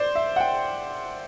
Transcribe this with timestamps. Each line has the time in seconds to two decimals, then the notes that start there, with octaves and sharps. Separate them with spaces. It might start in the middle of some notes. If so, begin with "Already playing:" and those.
Already playing: C5 D5
0.16 E5
0.36 F#5
0.40 G5